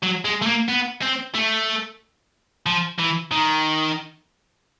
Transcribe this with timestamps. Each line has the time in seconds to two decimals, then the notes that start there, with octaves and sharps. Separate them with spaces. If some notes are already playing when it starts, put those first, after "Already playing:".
0.03 F#3
0.25 G#3
0.42 A3
0.47 A#3
0.68 B3
1.02 C4
1.34 A3
2.66 F3
2.99 E3
3.32 D#3